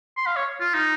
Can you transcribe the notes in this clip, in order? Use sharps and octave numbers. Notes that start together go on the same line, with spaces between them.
C6
F5
C#5
F4
D#4